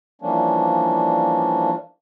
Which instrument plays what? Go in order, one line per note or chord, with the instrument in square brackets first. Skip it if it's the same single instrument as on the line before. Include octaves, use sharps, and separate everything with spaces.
[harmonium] E3 F3 G3 A#3 C#4 D4